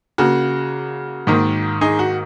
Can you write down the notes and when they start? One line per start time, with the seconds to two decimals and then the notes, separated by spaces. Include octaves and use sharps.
0.18 C#3 A#3 F#4
1.27 G#2 D#3 A#3
1.81 D#4 G#4
1.99 F#4